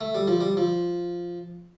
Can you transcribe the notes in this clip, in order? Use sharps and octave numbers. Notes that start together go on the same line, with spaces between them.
A3
G3
F3
G3
F3